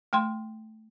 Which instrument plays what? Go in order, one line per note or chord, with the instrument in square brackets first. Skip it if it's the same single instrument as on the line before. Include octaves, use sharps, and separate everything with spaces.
[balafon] A3 G5 C6